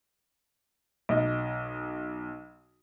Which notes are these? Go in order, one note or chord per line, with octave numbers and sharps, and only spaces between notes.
B1 D#5